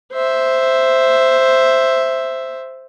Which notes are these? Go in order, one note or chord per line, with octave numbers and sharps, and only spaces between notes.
C5 E5